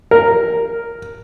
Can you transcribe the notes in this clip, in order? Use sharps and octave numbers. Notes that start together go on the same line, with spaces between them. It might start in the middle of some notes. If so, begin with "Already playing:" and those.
A#4